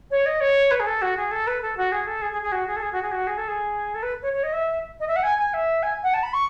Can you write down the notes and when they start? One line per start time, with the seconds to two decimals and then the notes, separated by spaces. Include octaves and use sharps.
0.10 C#5
0.25 D#5
0.40 C#5
0.70 B4
0.79 G#4
0.86 A4
1.01 F#4
1.16 G#4
1.31 A4
1.46 B4
1.61 A4
1.76 F#4
1.91 G#4
2.06 A4
2.21 G#4
2.31 G#4
2.42 G#4
2.51 F#4
2.66 G#4
2.76 A4
2.82 G#4
2.92 F#4
3.02 G#4
3.11 F#4
3.26 G#4
3.37 A4
3.48 G#4
3.94 A4
4.02 B4
4.22 C#5
4.32 C#5
4.43 D#5
4.52 E5
4.99 D#5
5.07 E5
5.15 F#5
5.22 G#5
5.38 G#5
5.53 E5
5.82 G#5
6.03 F#5
6.13 A5
6.22 B5
6.33 C#6